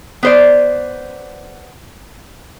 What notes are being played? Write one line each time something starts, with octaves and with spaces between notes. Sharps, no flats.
B3 C5 D5